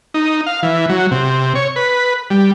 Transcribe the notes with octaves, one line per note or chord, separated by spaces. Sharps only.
D#4
F5
E3
F#3
C3
C#5
B4
G3